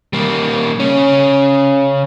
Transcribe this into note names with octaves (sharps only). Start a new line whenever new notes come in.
G3 A#3
C#3 C#4